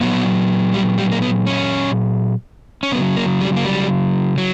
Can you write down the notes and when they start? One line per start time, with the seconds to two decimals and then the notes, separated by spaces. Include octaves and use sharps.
0.01 A#2 F#3 B3
0.74 G3
0.98 G3
1.12 A#3
1.22 B3
1.47 C#4
2.83 C#4
2.92 C#3 B3
2.96 F#3
3.16 A#3
3.41 G3
3.56 A#3
3.65 G3
4.38 F#3